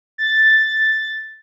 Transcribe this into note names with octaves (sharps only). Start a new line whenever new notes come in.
A6